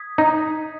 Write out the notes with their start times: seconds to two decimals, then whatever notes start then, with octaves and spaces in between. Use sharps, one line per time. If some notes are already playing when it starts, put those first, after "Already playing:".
Already playing: D#6 G#6 B6
0.18 D#4